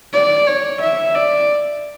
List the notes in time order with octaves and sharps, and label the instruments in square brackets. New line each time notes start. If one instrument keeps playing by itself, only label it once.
[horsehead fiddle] D5
C#5
E5
D5